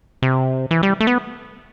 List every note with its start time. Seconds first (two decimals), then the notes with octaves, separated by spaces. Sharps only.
0.22 C3
0.71 E3
0.83 G3
1.00 A3
1.07 B3